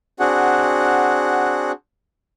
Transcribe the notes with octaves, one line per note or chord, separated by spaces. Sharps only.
C4 D4 F#4 G#4 F#5